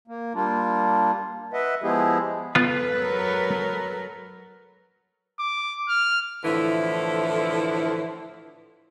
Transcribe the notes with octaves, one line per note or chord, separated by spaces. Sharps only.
A#3
G3 A#3 D4 F4
B4 D#5 E5 F#5
F3 G#3 B3 E4 G4 G#4
B3 F4 A4 B4
F#3 A#4
D6
F6
A2 D3 E3 F3 E4 A4